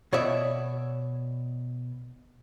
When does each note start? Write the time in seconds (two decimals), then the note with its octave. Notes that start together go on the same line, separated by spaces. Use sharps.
0.13 B2 C#5 D5 E5